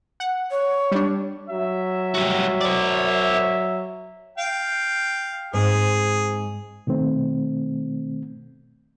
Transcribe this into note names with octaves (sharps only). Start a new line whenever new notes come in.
F#5
C#5
G3 D4
F#3 E5
G3 F#4
C5 D5
F5 G5
G#2 C4 G#4
B2 D#3 A3 C4